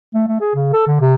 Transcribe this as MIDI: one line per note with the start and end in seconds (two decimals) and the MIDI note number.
0.14 0.24 57
0.28 0.37 57
0.41 0.54 68
0.55 0.72 49
0.73 0.85 69
0.87 1.01 50
1.01 1.15 48